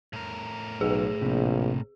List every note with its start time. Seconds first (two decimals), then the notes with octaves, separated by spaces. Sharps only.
0.13 A2 A#4
0.81 B1 G#4
1.22 A#1 C3